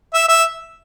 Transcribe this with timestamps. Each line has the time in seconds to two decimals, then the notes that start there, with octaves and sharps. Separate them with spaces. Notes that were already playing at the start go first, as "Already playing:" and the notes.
0.14 E5
0.28 E5